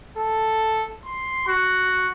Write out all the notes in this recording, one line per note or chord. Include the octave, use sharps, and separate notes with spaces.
A4
C6
F#4